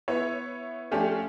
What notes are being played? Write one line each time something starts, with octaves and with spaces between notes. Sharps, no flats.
B3 E4 C#5
F3 A3 C#4 D4 F4 G4